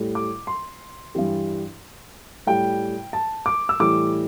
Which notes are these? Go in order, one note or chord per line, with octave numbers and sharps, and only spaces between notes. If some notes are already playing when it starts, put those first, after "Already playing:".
Already playing: A2 G3
D6
C6
G2 E3 G3
A2 G3 G5
A5
D6
E6
A2 E3 G3 D6